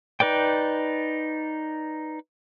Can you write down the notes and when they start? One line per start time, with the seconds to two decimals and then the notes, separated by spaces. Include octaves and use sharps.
0.20 D#4 B4 D5 G5